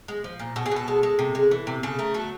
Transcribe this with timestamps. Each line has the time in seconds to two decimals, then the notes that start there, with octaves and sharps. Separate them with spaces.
0.08 G#3
0.24 F3
0.39 A#2
0.56 B2 A4
0.66 G#4
0.71 B2 A4
0.88 G#3
1.03 G#3
1.19 C3
1.35 G#3
1.51 E3
1.67 C3
1.83 C#3 A4
1.99 A3 A#4
2.14 F#3 A4